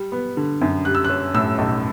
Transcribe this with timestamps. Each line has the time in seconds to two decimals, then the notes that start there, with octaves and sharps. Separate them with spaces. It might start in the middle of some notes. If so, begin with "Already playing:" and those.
Already playing: G3
0.12 B3
0.37 D3
0.61 F#2
0.85 G3 F#6
0.95 E6
1.04 F#6
1.10 C#4
1.34 A2 E6
1.58 B1